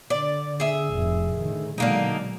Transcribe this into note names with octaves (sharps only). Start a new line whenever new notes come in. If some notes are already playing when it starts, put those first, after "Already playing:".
D3 D5
G#4 E5
F1 F2 A2
A2 D3 D#3
B2 D3 F#3 G#3 A#3 D#4